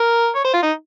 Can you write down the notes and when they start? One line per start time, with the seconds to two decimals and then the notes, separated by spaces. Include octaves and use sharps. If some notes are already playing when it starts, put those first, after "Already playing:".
Already playing: A#4
0.35 C#5
0.45 C5
0.54 F4
0.63 D#4